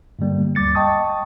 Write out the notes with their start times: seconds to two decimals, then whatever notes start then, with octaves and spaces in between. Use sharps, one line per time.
0.19 G2 D3 G3 A#3
0.55 D2 G3 D6 A6 C#7
0.75 D#5 G5 A5 C#6 D#6